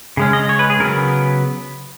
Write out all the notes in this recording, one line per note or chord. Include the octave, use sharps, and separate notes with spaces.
C#3 G#3 C#4
D#5
C#5
B4
G#4
C#3 F#3 B3 A#4